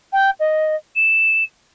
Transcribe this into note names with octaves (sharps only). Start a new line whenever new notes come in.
G5
D#5
E7